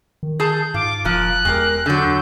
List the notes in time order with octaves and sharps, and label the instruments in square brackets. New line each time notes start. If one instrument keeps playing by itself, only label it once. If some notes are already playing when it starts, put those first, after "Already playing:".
[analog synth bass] D#3
[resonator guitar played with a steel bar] G#4 A5 [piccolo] G6
[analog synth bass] G#2 [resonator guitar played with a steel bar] F4 [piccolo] D6
[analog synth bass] E1 [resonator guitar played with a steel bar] A#2 F3 [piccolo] F#6
[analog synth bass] E2 [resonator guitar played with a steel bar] G#3 G4 A#4
[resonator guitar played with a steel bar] D3 F#3 [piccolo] G6